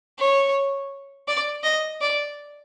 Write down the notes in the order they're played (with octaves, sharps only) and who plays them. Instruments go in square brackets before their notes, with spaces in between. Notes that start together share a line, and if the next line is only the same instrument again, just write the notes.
[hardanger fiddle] C#5
D5
D#5
D5